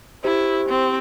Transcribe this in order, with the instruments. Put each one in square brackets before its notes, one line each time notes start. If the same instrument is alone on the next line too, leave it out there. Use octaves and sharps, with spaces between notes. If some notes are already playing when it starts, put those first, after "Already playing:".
[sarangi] E4 [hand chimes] G4 C5
[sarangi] C4